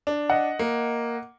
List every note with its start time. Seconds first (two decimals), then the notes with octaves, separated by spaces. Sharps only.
0.07 D4
0.30 D#5 F#5
0.59 A#3